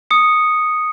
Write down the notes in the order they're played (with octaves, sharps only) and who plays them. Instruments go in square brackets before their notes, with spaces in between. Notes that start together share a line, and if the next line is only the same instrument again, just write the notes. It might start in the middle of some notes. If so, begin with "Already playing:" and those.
[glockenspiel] D#6 C#7